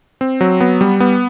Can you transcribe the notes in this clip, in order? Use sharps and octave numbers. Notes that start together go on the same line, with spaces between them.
C4
F#3
B3
G3
B3